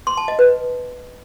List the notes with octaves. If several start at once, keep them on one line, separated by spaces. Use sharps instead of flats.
C6
A5
D#5
B4